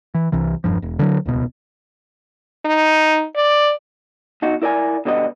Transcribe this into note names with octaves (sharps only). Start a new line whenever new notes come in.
E3
C2 C3 E3
E1 G2 F3
E1
D3 F3 F#3
D#1 C#2 B2
D#4
D5
B2 D#4 F#4
E4 A#4 D5 D#5 G#5
B2 D3 G3 B3 D#5